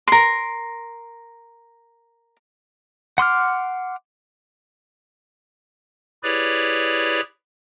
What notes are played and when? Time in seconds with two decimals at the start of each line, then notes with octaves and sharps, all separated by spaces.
0.08 A#4 C6
3.18 F#5 C6 D6 F6
6.23 E4 G4 G#4 B4 C#5 D5